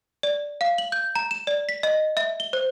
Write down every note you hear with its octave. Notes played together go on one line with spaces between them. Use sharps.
D5
F5
F#7
G6
A#5
E7
D5
B6
D#5
E5
G7
C5